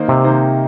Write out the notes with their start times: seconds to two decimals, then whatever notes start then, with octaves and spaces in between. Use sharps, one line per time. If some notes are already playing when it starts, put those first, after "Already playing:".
Already playing: D#3 A#3 D#4 C5
0.08 C3
0.24 D#3 A#3 D#4 C5